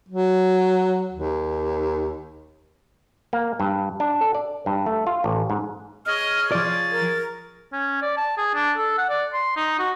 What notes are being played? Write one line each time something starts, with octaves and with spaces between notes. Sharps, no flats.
F#3
D#2
A#3
G2
D4
A4
D5
G2
A3
F4
A1
G#2
G#4 C#5 D#5 F6
F3 D5 A6
A#4
C#4
D5
A5
G#4
D4
A4
F#5
D5
C6
D#4
F#4